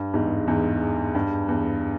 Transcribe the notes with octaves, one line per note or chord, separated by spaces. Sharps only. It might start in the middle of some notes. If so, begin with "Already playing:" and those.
Already playing: G2
E2 G#2
E2 G#2
G2
E2